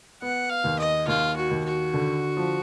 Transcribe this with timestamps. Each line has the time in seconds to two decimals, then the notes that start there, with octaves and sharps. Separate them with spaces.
0.22 B3 F#5
0.50 F5
0.64 D#2
0.79 D#5
1.07 D#2 F4
1.36 F#4
1.51 D#2
1.65 F#4
1.94 D3
2.37 F3